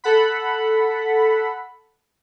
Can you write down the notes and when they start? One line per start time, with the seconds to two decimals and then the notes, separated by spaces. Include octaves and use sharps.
0.04 A4 F#5 B5